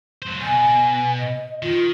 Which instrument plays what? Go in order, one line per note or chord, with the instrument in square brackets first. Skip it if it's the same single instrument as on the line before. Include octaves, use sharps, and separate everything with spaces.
[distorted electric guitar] F#3 C5
[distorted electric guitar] B2 [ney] G#5
[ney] D#5
[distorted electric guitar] D#3 [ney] F4